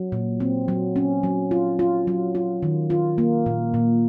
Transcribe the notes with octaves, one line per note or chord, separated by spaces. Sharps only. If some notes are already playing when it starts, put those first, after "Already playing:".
Already playing: F#3
A#2
C4
F#3
C#4
F#3
F4
F4
F#3
F4
D#3
F4
A#3
A#2
A#2